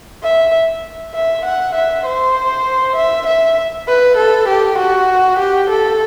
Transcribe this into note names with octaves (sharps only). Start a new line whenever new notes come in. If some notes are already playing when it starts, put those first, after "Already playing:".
E5
E5
F#5
E5
C5
E5
E5
B4
A4
G4
F#4
G4
A4